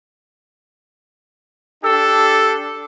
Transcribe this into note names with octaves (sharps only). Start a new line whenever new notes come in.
D4 G4 A4 E6